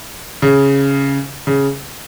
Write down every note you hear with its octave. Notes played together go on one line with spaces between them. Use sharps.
C#3
C#3